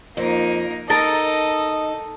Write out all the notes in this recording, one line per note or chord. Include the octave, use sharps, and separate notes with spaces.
F2 A#3 D#4
D#4 A4 A#4 D#5 A5 A#5